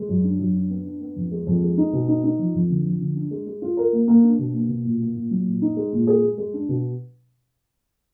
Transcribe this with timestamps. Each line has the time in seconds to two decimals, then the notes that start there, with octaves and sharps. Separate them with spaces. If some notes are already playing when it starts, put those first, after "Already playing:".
Already playing: G#3
0.09 F#2
0.24 D4
0.39 F#2
0.55 D4
0.70 B3
0.85 D4
1.01 B3
1.16 F2
1.31 G#3
1.47 F2
1.62 G#3
1.78 D#4
1.93 B2
2.08 D#4
2.24 D#4
2.39 F3
2.54 F2
2.70 D3
2.85 F3
3.00 D3
3.16 D4
3.31 G#3
3.47 G#3
3.62 F4
3.77 A#4
3.93 A#3
4.08 A#3
4.23 D4
4.39 B2
4.54 A#3
4.69 B2
4.85 A#2
5.00 A#3
5.15 A#2
5.31 F#3
5.46 A#2
5.62 D#4
5.77 G#3
5.93 A#2
6.07 G#4
6.22 G#3
6.38 G#3
6.54 D4
6.69 B2